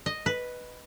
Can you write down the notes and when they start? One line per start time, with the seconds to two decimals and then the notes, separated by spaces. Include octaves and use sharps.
0.06 D#5
0.26 B4